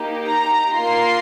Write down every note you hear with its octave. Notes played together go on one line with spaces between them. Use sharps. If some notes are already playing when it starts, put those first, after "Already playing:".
Already playing: A#3 D#4 G4
A#5
A#3 F4 C6